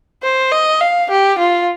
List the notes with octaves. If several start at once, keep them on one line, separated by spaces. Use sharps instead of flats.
C5
D#5
F5
G4
F4